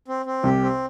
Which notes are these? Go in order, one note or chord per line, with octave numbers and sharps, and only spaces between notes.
C4
C4
C2 C3 G4
C4